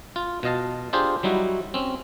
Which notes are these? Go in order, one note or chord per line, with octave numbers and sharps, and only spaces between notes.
F4
B2 F4 D#5 F5 A5
D4 F4 G4 G#4 C5
F#3 G3 D#4 E4 F#4
C4 C#4